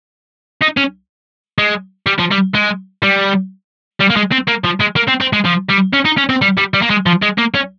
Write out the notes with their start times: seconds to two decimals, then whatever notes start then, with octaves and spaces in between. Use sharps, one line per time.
0.61 D#4
0.77 C#4
1.58 G#3
2.06 G3
2.19 F3
2.31 G3
2.54 G#3
3.03 G3
4.00 G3
4.10 A#3
4.16 G#3
4.32 C4
4.48 A#3
4.65 F3
4.81 G#3
4.97 A#3
5.08 C4
5.21 C4
5.33 G#3
5.45 F3
5.69 G3
5.93 C#4
6.05 D#4
6.17 C#4
6.30 C4
6.42 G3
6.58 G3
6.74 G3
6.82 A#3
6.90 G#3
7.06 F3
7.23 G#3
7.38 A#3
7.55 C#4